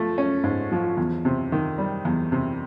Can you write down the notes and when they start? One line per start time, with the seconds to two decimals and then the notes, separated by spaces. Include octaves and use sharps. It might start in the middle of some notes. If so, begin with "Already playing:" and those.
Already playing: F3 A3
0.18 C#4
0.44 G#2
0.72 F3
0.97 E2
1.25 C3
1.52 D#3
1.78 G3
2.05 E2
2.32 C3